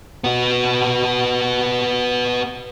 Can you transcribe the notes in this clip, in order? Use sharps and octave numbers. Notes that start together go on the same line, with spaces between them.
B3 F#4